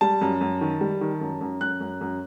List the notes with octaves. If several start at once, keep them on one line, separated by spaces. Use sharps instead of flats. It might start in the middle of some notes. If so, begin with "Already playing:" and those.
G3 A5
F#2
F#2
D#3
G3
D#3
F#2
F#2
F#2 F#6
F#2
F#2